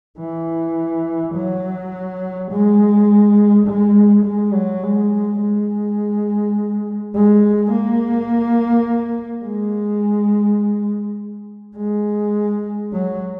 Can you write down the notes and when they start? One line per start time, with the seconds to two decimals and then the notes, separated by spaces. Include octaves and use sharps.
0.19 E3
1.35 F#3
2.51 G#3
3.67 G#3
4.25 G#3
4.54 F#3
4.83 G#3
5.41 G#3
7.14 G#3
7.72 A#3
9.45 G#3
11.77 G#3
12.93 F#3